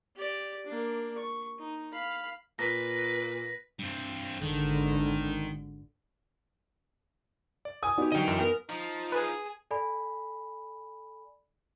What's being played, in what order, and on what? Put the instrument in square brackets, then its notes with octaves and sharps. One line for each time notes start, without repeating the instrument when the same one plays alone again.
[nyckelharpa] G4 D5
A#3 D4
C#6
D#4
F5 B5
[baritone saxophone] A#2 [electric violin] B4 [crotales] A#6 B6
[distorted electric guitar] G2 C4
[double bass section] G#1 D3 [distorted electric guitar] D#3
[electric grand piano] D5
[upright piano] G#5 D#6
[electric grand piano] B3 G4 [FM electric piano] D#4 F#4 D5
[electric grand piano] D3 F#3 [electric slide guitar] D#5 G5
[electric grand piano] F#2 E3
[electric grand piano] B3 [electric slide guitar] A#4
[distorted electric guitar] F3 [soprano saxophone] D#4
[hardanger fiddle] G#4 [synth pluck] B4
[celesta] A4 D5 G#5 B5